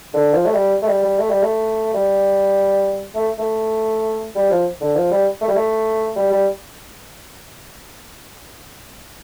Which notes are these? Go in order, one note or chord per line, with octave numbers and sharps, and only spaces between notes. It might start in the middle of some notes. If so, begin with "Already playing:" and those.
D3
F3
A3
G3
A3
G3
G3
A3
G3
A3
G3
A3
A3
G3
F3
D3
F3
G3
A3
G3
A3
G3
G3